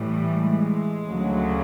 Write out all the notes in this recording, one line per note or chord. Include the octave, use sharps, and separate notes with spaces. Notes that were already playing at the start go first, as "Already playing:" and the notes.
Already playing: A2 E3 G3
G#3
D2 C#3 F#3